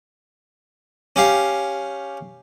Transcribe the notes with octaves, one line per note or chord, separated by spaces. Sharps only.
C#4 G4 F5